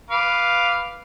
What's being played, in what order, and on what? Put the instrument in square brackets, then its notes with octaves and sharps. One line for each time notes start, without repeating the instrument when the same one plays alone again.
[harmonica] B4 F5 D6